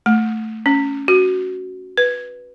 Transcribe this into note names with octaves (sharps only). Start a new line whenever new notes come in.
A3
C#4
F#4
B4